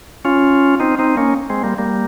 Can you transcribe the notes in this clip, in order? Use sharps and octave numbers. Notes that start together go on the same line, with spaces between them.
C#4 F4
C4 D#4
C4 D#4
A#3 C#4
G#3 C4
G3 A#3
G3 A#3